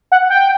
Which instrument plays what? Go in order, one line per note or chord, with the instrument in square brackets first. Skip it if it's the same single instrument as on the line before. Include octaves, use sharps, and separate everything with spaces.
[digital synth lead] F#5
G5